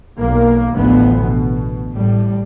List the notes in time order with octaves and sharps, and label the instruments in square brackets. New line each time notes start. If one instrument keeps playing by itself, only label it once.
[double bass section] B1 A#3
A1 D2 F3 B3
B2
A2 G3